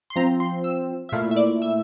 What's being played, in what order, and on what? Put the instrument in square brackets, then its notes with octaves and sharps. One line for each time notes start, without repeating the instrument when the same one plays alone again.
[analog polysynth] C6
F3 C4 F4 A#5
C6
E6
E5
A#2 A3 E4 F5
E5
D5
E5